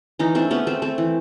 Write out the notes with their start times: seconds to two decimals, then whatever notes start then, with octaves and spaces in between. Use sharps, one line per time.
0.19 E3 C#4 D#4
0.35 A3 C4 D4
0.51 A3 B3 C#4
0.67 A3 C4
0.82 A3 C4
0.98 E3